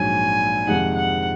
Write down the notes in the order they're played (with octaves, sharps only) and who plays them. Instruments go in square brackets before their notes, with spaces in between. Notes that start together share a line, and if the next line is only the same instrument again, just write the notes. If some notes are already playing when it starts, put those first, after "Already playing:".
Already playing: [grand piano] A#1 G#2 F#3 [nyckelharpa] G#5
[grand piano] F2 C3 D#3 G#3 D#4 [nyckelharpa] F#5
[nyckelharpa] F#5